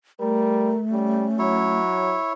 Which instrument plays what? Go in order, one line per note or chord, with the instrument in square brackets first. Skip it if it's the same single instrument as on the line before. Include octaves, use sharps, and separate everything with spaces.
[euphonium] G3 [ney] A3 [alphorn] A#4
[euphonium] G3 [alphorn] C#4
[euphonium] F#3 [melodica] E4 C#5